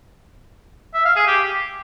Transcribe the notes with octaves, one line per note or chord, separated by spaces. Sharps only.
E5
F5
G#4
G4